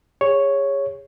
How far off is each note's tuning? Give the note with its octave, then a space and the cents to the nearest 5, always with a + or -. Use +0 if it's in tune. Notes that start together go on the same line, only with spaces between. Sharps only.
G#4 -30 C#5 +0